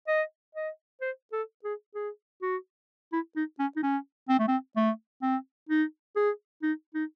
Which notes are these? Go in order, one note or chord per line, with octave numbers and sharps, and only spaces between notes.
D#5
D#5
C5
A4
G#4
G#4
F#4
E4
D#4
C#4
D#4
C#4
C4
A3
C4
A3
C4
D#4
G#4
D#4
D#4